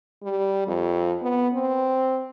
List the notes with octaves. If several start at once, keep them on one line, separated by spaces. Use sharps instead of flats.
G3
F2
B3
C4